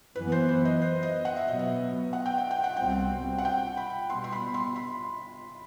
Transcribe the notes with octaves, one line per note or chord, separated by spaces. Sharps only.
F#2 E3 B3 B4
C5
C5
D#5
C5
D#5
F#5
E5
B2 F#3 B3 D#5
E5
F#5
G5
F#5
G5
F#5
C2 B2 G3 C4 G5
F#5
F#5
G5
B5
B2 G3 B3 C6
C6
B5
C6
B5